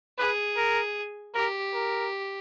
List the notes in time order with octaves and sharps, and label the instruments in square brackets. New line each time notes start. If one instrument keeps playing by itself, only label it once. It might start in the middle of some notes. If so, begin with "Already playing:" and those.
[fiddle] G#4 [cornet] B4
[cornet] A#4
[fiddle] G4 [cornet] A#4
[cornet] A#4